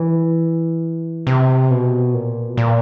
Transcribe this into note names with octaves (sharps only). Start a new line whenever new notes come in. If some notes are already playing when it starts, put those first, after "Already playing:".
Already playing: E3
C3
B2
A#2
B2
A#2